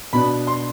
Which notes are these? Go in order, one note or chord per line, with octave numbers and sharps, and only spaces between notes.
B2 B3 D4 B5
C6